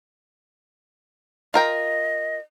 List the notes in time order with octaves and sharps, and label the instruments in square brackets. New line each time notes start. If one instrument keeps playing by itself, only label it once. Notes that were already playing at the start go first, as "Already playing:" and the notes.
[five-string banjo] F4 A#4 G5 [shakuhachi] D#5